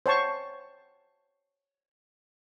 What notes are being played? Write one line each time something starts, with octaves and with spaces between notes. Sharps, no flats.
C5 C#5 A5 C#6